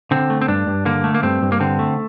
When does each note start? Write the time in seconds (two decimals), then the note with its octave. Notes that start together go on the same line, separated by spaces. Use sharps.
0.11 D3 C4
0.30 A3
0.42 C4
0.48 G2 D4
0.67 G2
0.86 D3 A#3
1.04 A3
1.15 A#3
1.23 G2 C4
1.42 G2
1.52 A#3
1.60 D3 C4
1.79 A3